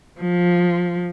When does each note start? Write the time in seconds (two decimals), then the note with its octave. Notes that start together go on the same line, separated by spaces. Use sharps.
0.21 F3